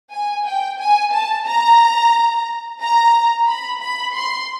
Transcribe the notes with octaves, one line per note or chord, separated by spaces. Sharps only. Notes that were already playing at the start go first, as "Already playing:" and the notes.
G#5
G5
G#5
A5
A#5
A#5
B5
B5
C6